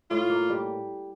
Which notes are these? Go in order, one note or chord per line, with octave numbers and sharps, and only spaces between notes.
A2 F4
A#3
G3